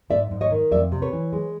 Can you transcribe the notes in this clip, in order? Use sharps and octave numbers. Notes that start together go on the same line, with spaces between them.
G#2 D5 E5
G#2
C#5 D#5
D#3
F2 D5 E5
C3
B4 C#5
E3
G#3